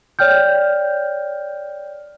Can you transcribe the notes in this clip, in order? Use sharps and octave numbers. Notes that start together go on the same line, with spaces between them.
C#5 D5 G5 F6 G6